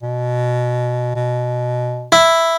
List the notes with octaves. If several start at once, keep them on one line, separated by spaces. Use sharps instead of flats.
B2
B2
E4